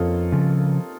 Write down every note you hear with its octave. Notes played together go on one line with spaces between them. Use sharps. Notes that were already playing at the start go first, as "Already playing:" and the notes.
Already playing: F2 A#3 C4 C#4 D#4 F4 A4
C#3 F3